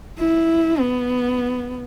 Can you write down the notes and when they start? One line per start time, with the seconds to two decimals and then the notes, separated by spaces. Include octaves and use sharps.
0.19 E4
0.80 B3